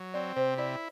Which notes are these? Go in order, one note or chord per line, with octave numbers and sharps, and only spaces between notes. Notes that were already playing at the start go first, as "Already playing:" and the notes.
Already playing: F#3
C4 D5
C3 C5
E4 D5